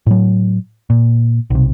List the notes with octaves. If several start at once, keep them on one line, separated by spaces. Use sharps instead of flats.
A2 F#3
A#2
B1 C3